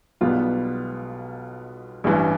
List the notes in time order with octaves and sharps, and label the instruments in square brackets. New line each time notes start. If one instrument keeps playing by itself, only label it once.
[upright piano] B1 B2 G3 B3 F4
A1 G2 E3